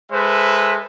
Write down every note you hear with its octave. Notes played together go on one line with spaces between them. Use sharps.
G#3 A4 B4 C5 E5